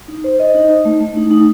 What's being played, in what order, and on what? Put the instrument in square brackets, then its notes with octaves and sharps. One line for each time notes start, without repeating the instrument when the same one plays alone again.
[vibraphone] D#4
C5
D#5
D#4
D#4
A3
A3
D#4
D#4